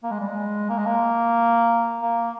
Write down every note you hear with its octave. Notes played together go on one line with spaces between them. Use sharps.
A#3
G#3
G3
G#3
A#3
G#3
A#3
A#3